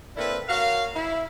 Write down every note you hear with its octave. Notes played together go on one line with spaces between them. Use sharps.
A#3 C4 D4 E4 A4 B4
F#4 A#4 C#5 F5
E4